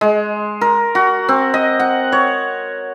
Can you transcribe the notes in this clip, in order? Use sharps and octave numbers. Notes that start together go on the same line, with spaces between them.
G#3
A#4
F#4
C4
D#5
F#5
C#5